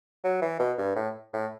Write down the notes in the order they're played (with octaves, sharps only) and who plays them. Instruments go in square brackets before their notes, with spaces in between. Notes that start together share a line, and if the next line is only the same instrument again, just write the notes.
[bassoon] F#3
E3
B2
G2
A2
A2